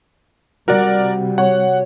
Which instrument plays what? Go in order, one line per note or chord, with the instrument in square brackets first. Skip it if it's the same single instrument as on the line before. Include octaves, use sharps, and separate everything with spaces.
[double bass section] C3 G3 [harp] F#4 [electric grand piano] A#4 D5
[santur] C#5 [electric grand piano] F#5